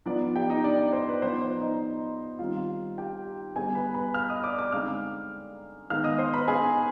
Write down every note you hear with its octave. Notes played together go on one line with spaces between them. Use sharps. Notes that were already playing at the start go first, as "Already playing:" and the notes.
F3 B3 D4 D#4 D5
G4 G5
D#4 D#5
D4 D5
D4 D5
C5
B4
F3 B3 D#4 C5
C5
D#4 D#5
D#3 G3 C4 D#4 F4 F5
G4 G5
D3 G3 B3 G#4 G#5
B4 B5
B4 B5
F5 F6
D#5 D#6
D5 D6
D5 D6
D3 G#3 C4 D#4 F5 F6
D#3 G#3 B3 F5 F6
D#5 D#6
C5 C6
B4 B5
G#4 G#5